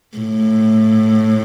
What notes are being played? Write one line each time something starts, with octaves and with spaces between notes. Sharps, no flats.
A2